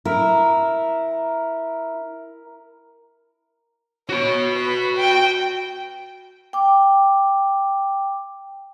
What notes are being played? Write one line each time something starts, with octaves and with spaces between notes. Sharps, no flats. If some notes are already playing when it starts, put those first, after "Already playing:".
E4 A#4
F#4 C#5 B5
B4
G5
G5 D6